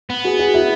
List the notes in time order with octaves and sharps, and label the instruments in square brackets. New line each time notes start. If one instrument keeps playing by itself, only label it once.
[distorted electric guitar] B3
[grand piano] F#4 G#4
F#4 G#4
E4 F#4